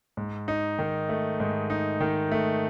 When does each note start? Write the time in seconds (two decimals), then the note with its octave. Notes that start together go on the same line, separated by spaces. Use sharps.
0.17 G#2
0.48 D#4
0.79 D#3
1.09 A3
1.40 G#2
1.70 D#4
2.01 D#3
2.32 A3